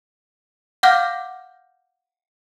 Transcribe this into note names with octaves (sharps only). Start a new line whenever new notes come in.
F5 F#5 D6 F6 G6 A#6